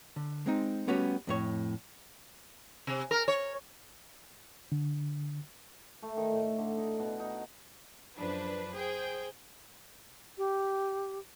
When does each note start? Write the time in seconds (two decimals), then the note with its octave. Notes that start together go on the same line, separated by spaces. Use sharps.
0.16 D3
0.46 G#3 C4 D#4
0.87 G3 A3 B3 C#4 F#4 G4
1.27 F2 A2 C#5
2.87 C3
3.11 A#4
3.28 C#5
4.72 D3
6.03 A3
6.17 D#3
6.31 A2
6.58 D3
6.78 D#4
6.99 B2
7.20 D#4
8.17 F#2 C#3 F3 D4 B4
8.76 G#4 C5 G5
10.38 G4